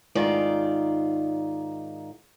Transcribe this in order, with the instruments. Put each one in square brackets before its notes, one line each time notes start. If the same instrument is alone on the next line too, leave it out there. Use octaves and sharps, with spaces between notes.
[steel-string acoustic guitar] G#2 D#3 F4 D5